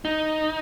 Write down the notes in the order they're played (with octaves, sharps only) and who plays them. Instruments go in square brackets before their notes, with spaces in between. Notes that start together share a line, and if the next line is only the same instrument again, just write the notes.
[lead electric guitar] D#4